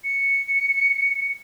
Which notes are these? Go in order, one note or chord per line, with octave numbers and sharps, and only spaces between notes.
C#7